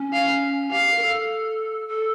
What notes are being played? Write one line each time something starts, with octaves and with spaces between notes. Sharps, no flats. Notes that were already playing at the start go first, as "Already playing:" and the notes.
Already playing: C#4
F5
G4 F5
A#4
A4
A4